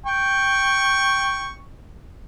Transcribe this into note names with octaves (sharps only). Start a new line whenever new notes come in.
G5 C#6